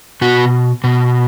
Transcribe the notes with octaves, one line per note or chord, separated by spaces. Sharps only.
B2 F#4
B2